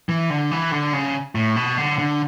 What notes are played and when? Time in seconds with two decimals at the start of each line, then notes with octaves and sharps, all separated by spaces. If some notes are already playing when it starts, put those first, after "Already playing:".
0.09 E3
0.30 D3
0.51 E3
0.72 D3
0.93 C#3
1.35 A2
1.56 B2
1.78 D3
1.98 D3